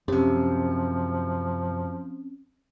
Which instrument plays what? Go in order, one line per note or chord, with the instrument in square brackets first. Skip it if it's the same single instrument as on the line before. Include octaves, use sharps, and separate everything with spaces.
[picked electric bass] F#2 C3 [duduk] F3 [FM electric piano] C4 C#4 [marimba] G4